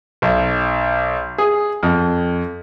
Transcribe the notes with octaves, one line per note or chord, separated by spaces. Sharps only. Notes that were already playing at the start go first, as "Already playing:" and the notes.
B1
G#4
F2